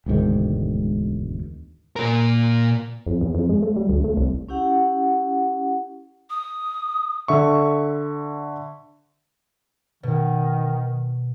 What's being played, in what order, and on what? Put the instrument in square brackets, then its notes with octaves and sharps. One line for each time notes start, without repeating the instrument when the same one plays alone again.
[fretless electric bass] E1 D2 G#2 D#3
[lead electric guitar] A#2 A#4
[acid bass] F2
E2
F2
G#3
A3
G3
D2
A3
C2
[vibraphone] C#4 E4 G4 F#5
[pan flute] D#6
[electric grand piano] D3 E5 C#6
[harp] B2 [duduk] D#3